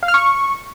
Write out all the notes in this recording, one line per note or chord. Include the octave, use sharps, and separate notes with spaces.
F5
F6
C#6